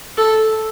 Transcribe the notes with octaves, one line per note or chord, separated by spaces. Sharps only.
A4